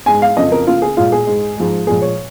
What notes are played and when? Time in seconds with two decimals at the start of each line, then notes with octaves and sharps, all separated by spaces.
0.06 G#2 G#3 G#5
0.22 F5
0.37 F2 C#3 F3 D#5
0.52 A#4
0.67 C#3 A#3 F4
0.82 G#4
0.97 A#2 G#3 F4
1.12 G#4
1.27 G#2 G#3
1.57 G#2 F3 G#3
1.87 A#2 F3 G#3 G#4
2.02 C#5